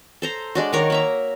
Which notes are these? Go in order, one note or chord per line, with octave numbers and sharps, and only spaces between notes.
A4 C5 A#5
G#3 D4 F#4
D#3 A#4 C#5
A#3 E5 A#5